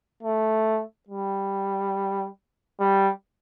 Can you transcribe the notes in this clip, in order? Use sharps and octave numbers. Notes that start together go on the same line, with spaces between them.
A3
G3
G3